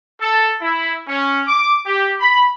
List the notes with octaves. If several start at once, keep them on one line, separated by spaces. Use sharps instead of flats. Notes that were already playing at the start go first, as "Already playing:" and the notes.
A4
E4
C#4
D6
G4
B5